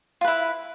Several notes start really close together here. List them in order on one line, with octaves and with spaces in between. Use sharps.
F4 B4 E4